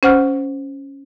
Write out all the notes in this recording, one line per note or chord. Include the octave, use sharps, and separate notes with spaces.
C#4 C5 F#5 F6